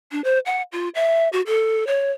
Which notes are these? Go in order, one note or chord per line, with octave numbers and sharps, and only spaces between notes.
D4
C5
F#5
F4
E5
F#4
A4
C#5